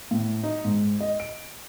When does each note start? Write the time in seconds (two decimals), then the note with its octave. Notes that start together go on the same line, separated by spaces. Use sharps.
0.11 A2
0.43 D#4
0.65 G#2
1.01 D#5
1.20 D7